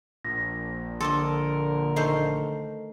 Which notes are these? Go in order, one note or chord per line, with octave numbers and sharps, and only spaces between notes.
A#1 A#6
D3 A4 A#4 D5 D#5 C6
D#3 A3 A4 C5 D#5